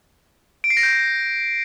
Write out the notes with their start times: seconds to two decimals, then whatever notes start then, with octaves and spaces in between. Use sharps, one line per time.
0.64 D7
0.70 C7
0.77 A#6
0.83 G6